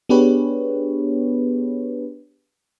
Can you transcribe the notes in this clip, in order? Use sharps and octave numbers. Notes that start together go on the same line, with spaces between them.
B3 D4 G4 G#4 B4 C#5